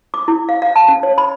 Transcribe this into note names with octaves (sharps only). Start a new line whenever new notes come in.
D6
E4
F5
F5
A5
C#4
C#5
B5